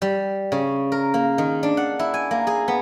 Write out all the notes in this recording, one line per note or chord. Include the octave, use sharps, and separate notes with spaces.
G3
C#3
A#4
A#3
D#3
D4
F#5
E4
G#5
A#3
G#4
B3